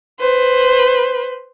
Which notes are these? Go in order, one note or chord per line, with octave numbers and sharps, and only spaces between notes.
B4 C5